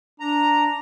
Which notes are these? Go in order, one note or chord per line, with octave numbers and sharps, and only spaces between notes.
D4 A#5